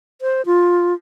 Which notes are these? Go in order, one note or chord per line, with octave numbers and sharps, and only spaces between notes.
C5
F4